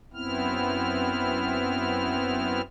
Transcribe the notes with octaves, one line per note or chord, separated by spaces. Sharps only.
F#2 B3 C4 E4 F6